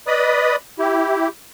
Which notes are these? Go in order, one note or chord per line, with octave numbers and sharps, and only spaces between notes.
B4 D5 D#5 B5 D#6
E4 G4